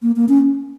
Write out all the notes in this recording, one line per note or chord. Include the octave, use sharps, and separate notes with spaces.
A#3
A#3
C#4